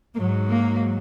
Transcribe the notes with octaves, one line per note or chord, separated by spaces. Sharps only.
G#2 F#3 A#3
A#3